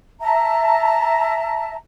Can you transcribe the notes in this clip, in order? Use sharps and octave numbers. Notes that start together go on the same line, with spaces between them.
E5 A5 A#5